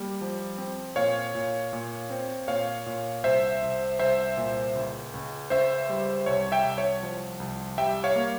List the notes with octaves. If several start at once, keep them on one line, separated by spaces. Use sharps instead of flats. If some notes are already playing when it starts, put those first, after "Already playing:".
Already playing: G3 A#3
F3
C4
A#2 C#5 F5
A#2
A#2
C4
A#2 C#5 F5
A#2
C2 C5 E5
C2
C2 C5 E5
A#2
C#2
C#2
C#2 C5 E5
G3
C2 C#5
E5 G5
C2
C#5
F3
C2
G3 E5 G5
C#5 F5
A#3